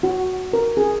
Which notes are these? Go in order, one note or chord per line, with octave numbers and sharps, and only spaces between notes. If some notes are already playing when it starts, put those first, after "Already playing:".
F#4
A#4
G#4